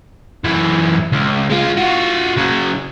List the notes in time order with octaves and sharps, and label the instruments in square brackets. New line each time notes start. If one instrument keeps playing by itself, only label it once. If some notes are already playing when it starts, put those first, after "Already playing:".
[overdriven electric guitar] F#2 E3
C#2
G#3 F4
F4 F#4
C#3 F#3